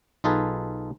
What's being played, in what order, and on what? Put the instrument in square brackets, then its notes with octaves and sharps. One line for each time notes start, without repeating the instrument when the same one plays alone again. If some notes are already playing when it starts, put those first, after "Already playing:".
[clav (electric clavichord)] B1 D#4 F4 G#4 A4 B4